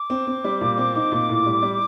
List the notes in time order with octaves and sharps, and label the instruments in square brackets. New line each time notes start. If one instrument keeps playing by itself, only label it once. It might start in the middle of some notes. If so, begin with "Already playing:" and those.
Already playing: [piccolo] D6
[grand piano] C4
C4
G3
A#2
C4
D#4
A#2
A2
G3
G3